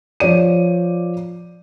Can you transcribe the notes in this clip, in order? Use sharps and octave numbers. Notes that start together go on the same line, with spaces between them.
F3 C#5 D5 D#7